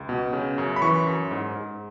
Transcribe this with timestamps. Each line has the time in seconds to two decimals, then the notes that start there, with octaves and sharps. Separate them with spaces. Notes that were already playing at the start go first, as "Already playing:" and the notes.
Already playing: C#2
0.09 B2
0.33 C#3
0.58 F#2
0.76 B5
0.82 E3 C#6
1.07 F#2
1.31 G#2
1.56 G#2